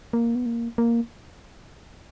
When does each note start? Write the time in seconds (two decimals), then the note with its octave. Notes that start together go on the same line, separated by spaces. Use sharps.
0.13 A#3
0.35 B3
0.46 A#3
0.78 A#3